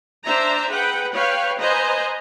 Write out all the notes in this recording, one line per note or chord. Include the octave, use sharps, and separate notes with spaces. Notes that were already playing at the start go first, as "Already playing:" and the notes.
D4 C5 E5 A#5
G#4 B4 F#5 G5
B4 C#5 F5 G5
B4 C5 D#5 G#5 A#5